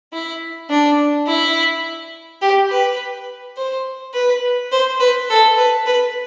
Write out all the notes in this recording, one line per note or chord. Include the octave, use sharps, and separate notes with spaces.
E4
D4
E4
G4
B4
C5
B4
C5
B4
A4
B4
B4